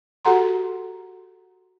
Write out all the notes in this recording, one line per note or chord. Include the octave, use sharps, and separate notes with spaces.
F#4 G4 A4 F#5 A#5 C6